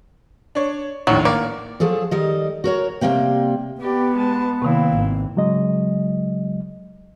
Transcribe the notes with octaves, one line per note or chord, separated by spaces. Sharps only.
D4 C#5
A#1 D#2 A2 F#3
A#3 D5
F3 F#3 G#4 A4
D#3 G3 D#5
F#4 A#4 C#5
C3 G3 A3 A#3 G5
B3 G4 D5
G#3 A5
C3 D#3 A#3 C4 E4
G#1
C#3 F#3 G#3 D#5